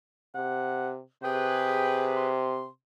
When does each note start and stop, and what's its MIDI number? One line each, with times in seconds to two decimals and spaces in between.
0.35 1.01 48
0.35 0.89 78
1.23 2.66 48
1.23 2.29 68
1.23 2.29 71
1.23 2.08 79
2.16 2.68 84